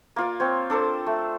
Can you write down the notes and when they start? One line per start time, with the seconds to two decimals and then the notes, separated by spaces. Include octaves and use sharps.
0.16 A#3 F4 D5
0.40 C4 C#5
0.70 D4 A4 A#4 C5
1.06 A3